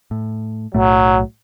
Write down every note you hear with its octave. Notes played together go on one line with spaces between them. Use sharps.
A2
B1 A2 F#3 A3